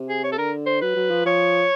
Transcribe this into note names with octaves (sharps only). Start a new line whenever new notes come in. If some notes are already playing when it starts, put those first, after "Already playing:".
Already playing: C3
G#4
C#5
A4
D3 A#4
C5
F#3 B4
F#3
F3
F3 C#5